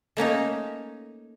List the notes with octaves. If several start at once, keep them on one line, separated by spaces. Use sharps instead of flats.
A3 A#3 C#4 D#4